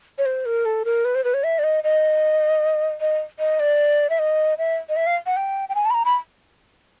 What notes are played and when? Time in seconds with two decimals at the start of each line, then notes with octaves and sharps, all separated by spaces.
0.18 C#5
0.26 C5
0.46 A#4
0.65 A4
0.85 A#4
1.05 B4
1.15 C5
1.24 B4
1.34 C#5
1.44 E5
1.59 D5
1.64 D#5
1.84 D#5
3.01 D#5
3.39 D#5
3.60 D5
4.10 E5
4.19 D#5
4.58 E5
4.89 D#5
4.96 E5
5.07 F5
5.26 F#5
5.37 G5
5.69 G5
5.75 G#5
5.85 A5
5.90 B5
5.94 A#5
6.05 B5